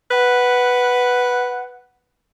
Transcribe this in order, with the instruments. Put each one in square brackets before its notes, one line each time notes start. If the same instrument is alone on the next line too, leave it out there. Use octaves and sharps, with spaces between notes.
[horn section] B4 F#5